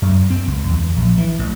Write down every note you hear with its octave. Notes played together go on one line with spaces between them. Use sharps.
F#2
C4
C#2
E2
A#1
E3
A1